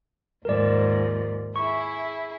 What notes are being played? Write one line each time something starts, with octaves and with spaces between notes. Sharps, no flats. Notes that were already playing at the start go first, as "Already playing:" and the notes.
D#2 G#2 F3 A#4 D5
E4 G#4 C#6